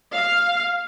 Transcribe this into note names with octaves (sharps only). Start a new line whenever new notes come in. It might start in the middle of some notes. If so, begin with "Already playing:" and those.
F5